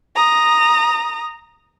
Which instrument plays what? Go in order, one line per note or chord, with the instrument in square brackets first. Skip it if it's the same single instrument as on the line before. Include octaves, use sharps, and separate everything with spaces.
[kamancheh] A#5 D#6